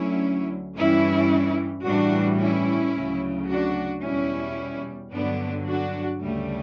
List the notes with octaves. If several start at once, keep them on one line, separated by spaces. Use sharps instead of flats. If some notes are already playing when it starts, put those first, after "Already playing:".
Already playing: D2 D3 F#3 C#4 E4
G2 E3 G3 C#4 E4
A2 E3 G3 D4 F#4
C#4 E4
D2 C#3 F#3
D4 F#4
E2 B2 G3 C#4 E4
G2 D3 F#3 B3 D4
D4 F#4
D2 C#3 G3 A3